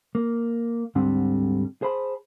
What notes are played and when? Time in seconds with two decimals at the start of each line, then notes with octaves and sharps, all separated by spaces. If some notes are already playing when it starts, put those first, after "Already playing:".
0.15 A#3
0.95 D2 G#2 D3 G3 C4
1.82 G#4 C5 A5 B5